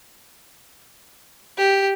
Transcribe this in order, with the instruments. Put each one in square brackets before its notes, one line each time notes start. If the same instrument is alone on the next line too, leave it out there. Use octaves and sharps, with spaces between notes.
[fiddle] G4